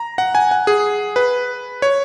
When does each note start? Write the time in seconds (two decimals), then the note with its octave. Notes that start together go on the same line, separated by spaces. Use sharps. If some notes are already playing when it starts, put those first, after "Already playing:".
Already playing: A#5
0.18 F#5
0.35 G#5
0.51 F#5
0.67 G#4
1.16 B4
1.82 C#5